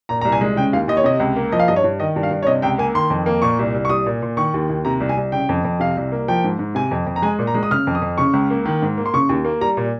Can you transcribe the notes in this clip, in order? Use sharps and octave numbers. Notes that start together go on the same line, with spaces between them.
A#2 A#5
C2 A#5
G#5
G#3
C#3 G5
D#2 F5
D#2 D#5
C#5
C3 D#5
C#2
A#3
F3 D#5
F5
G2 D#5
C#5
G2
D#3 D#5
G2
F5
G2
C#5
C3 D#5
C#2 G5
A#3 G#5
D#3 C6
F2
A#3
A#2 C#6
C2
C2
C#6
G3 D#6
A#2
A#2
D#3 C#6
D#2
D#2
C3 A#5
C2
G#5
C2
C#3 G5
F2
F2
C3 F5
C2
A#3
F3 G5
G#2
G#2
C3 G#5
F2
F2
A#5
G#3 G#5
A#2
A#5
G#3
D#6
C#3 F6
F2
D#6
F2
C#3 C#6
C#2
A#3
D#3
G#2
A#3
C6
C#3 C#6
D#2
A#3
G3 A#5
A#2